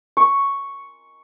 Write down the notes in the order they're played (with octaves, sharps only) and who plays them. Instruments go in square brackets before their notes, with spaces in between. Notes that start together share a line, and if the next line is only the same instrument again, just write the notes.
[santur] C#6